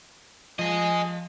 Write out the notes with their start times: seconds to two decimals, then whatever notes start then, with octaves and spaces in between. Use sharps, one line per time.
0.59 F3 G#4 D#5